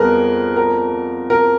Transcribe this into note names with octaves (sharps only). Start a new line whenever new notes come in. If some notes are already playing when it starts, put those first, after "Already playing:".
Already playing: F2 G3 B3 G#4 A#4 B4
A#4
A#4